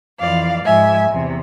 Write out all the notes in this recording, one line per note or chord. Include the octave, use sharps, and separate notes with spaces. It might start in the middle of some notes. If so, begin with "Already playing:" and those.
F2 E3 D5 F5
G#2 F3 E5 G#5
E2 C3